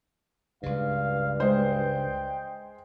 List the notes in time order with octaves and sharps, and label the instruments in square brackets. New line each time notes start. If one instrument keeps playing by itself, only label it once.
[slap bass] C#2 C#3 [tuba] G2 [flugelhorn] F5
[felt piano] G#3 C5 [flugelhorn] G5